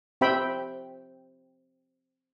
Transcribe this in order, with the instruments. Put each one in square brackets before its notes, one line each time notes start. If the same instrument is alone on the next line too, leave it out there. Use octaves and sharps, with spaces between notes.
[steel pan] C4 G4 C5 E5 G5 B5